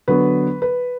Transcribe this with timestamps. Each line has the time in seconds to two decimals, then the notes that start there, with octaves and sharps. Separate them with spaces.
0.08 D3 F#3 B3 B4
0.62 B4